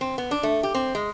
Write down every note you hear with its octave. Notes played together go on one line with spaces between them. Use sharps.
C4
B3
D4
A3
G4
C4
G#3